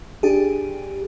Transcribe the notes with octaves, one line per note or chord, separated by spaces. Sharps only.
D4 G4 G#4